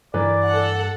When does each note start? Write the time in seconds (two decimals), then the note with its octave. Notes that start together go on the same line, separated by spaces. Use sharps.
0.14 G2 E3 A#4 B4 D5
0.47 A4 F#5